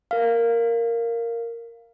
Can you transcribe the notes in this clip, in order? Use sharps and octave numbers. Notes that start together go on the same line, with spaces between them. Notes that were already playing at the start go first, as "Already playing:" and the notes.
A#4 F5